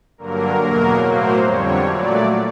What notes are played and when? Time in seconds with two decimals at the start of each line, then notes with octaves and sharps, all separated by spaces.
0.18 G2 D3 F#3 A#3 A#4
0.59 E2 B2 F#3 A#3 A#4
1.01 A2 F#3 A#3 C5
1.42 F2 D3 G3 C#5
1.83 A#2 F#3 A3 D5